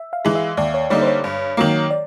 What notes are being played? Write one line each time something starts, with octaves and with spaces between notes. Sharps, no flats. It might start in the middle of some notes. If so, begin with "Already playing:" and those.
Already playing: E5
F5
E3 G#3
E5
D#2 D5
C#5
D3 G3 A#3 D#4 C#5
C5
C#5
G2
D#3 F#3 A#3
D5